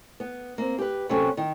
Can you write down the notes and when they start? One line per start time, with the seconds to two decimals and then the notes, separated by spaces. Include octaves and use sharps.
0.20 B3
0.58 A#3 C4
0.78 G4 B4
1.09 C3 F#3 A#3 C#4 F#4 A4
1.37 D#3